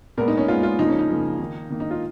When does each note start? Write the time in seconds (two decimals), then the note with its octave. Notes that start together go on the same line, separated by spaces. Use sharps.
0.17 A#2 G#3 B3 A#4
0.28 D#4
0.37 C#4
0.48 A#2 G#3 B3 F4
0.63 F4
0.79 C#3 F3 A#3 D#4
0.89 C#4
0.99 D#4
1.09 C#3 F3 A#3
1.39 D#3 A#3
1.70 D#3 A#3
1.80 D#4
1.91 F4